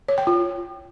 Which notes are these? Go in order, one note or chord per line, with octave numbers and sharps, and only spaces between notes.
C#5
G5
F4